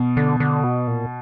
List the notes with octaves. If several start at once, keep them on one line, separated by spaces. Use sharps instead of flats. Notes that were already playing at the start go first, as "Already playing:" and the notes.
Already playing: B2
D3
D3
B2
A#2